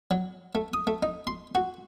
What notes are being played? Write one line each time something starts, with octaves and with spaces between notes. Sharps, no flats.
F#3
A3
D#6
A3
D#4
C6
F#4